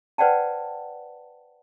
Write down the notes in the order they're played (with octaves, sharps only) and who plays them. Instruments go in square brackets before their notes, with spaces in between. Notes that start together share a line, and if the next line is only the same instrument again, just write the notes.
[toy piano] B4 C5 D5 F#5 G5 A5